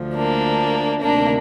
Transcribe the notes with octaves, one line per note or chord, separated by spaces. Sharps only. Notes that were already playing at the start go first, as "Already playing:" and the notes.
Already playing: D2 D3 F3
A#3 D4
D2 C3 D#3 A#3 D4